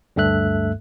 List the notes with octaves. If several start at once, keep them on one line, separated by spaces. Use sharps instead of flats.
D2 G2 A3 A4 E5 F#6